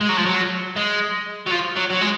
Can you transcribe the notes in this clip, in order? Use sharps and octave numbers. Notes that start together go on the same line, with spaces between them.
G#3
F#3
F3
F#3
G#3
F#3
F3
F#3
F#3
G#3